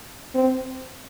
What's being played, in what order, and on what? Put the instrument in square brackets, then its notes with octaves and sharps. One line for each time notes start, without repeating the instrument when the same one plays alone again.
[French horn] C4